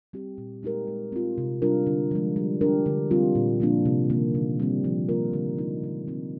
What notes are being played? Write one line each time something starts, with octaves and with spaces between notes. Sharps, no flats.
G3 C4 G4
A#2
G#3 D#4 G4 A#4
G#3
C4 F4
C3
G3 D4 F4 A#4
D3
F3 G#3
G3
D4 G4 A#4
D3
G3 C4 F4
A#2
F3 A#3 D4
C3
D#3 A#3
D3
G3 C4
F3
A#3 F4 A#4
D3
G#3 D#4
D3
F3 C4 D#4